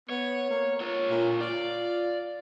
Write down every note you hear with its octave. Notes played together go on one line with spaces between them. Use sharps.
B3 C#5
A#3
F4 C#5
A#2
F4 D5